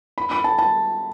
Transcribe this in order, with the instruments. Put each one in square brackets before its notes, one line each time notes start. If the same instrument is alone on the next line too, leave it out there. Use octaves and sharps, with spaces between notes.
[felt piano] B5
B5
A5
A5